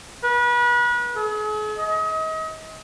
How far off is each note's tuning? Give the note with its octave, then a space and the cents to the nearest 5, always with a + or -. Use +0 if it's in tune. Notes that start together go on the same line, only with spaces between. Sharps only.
B4 -35
G#4 +40
D#5 +35